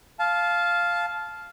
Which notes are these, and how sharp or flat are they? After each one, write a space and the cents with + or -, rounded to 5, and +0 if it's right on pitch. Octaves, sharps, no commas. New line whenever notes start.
F5 +0 A5 -20